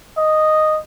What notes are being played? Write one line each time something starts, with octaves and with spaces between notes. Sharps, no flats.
D#5